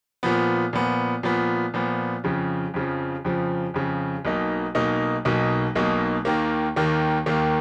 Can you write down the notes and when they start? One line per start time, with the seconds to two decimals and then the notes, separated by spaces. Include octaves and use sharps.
0.23 A#2 F3 B3
0.73 A#2 F3 B3
1.23 A#2 F3 B3
1.74 A#2 F3 B3
2.24 F2 C#3 F3
2.74 F2 C#3 F3
3.25 F2 C#3 F3
3.74 F2 C#3 F3
4.25 B1 B2 A#3 D#4
4.75 B1 B2 A#3 D#4
5.25 B1 B2 A#3 D#4
5.76 B1 B2 A#3 D#4
6.25 D#2 D#3 A#3
6.76 D#2 D#3 A#3
7.26 D#2 D#3 A#3